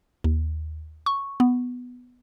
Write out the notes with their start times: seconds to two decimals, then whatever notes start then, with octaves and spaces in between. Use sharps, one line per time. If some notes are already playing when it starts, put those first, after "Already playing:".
0.24 D#2
1.06 C#6
1.40 B3